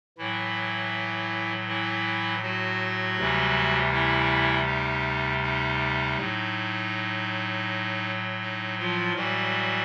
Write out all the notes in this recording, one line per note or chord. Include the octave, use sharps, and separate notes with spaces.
A2 E3 F#3 E4
E3 E4
F#3 F#4
D2 C3 E3 G3
E3 E4
D#4
D#4
A2 F#3
D#4
F3 F4
A2 E3 F#3 G3 F#4